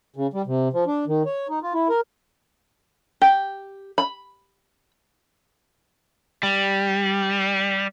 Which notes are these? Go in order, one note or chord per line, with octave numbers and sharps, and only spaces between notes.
C#3
G3
C3
F3
D4
D#3
C#5
D#4
F4
E4
A#4
G4
B5
G3